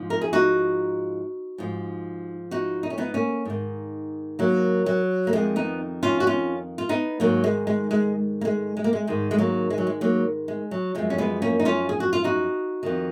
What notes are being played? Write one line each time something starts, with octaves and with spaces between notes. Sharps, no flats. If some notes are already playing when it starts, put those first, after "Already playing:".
Already playing: G#2 F3
A#4
G#4
D#4 F#4
G#2 F3
D#4 F#4
D#4
C#4
B3 D#4
A#3 C#4
G#2 D#3
F#3 A#3
F#3
A#3
F2 D#3 G#3
B3 D#4
C#4 F4
F#4
C#4 F4
F4
B3 D#4
G#2 D#3 F#3 A#3
G#3
G#3
G#3
A#3
G#3
G#3
A#3
G#3
G#2 D#3 G#3
G#3
F#3 A#3
G#3
F#3
G#3
F#3 A#3
G#3
F#3
F#2 F3 G#3
C#4
G#3 B3
A#3 C#4
D#4
C#4 F4
G#4
F#4
F4
D#4 F#4
F2 D#3